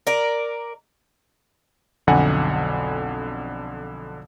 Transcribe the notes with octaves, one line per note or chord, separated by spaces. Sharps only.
A#4 D5
B1 F2 D3 F#5 G#5